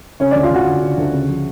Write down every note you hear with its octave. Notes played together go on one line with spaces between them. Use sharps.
C#3 C#4 C#5
D2 D4 D5
F4 F5
D2 F#4 F#5
D2
C#3
D2
C#3
F3